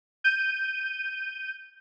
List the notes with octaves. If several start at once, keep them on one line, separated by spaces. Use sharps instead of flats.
G6 D#7